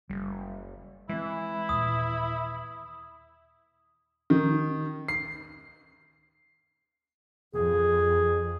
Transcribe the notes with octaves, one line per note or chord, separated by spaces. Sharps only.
F#1 G3
E3 G#3 C4 E4
D#2 A#2 D#6
D#3
C7
F2 G#4